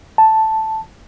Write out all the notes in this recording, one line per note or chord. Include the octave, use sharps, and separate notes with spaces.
A5